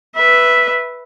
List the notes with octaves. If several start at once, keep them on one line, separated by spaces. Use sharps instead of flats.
B4 E5